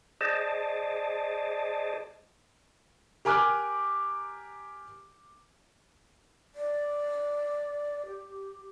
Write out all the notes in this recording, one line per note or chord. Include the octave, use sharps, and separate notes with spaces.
G#4 C5 D5 D#5 A5
G4 A#4 G#5 D6 F6 F#6
D5
G4